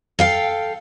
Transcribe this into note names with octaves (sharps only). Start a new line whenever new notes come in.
A4 F5 G5